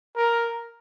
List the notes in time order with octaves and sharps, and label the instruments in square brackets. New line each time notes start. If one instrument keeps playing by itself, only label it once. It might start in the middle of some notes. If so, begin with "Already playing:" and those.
[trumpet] A#4